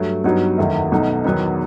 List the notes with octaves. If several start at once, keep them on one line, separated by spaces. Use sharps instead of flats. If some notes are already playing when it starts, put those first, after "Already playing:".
Already playing: G2 F#3 A3
G2 F#3 B3 D#4 F#4
F#1 E2 D#3 A3 E4
B1 B2 A3 D#4
E2 D#3 F#3 B3 D#4